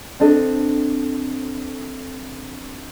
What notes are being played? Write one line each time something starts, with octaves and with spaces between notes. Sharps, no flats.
C4 D4 A4 D#5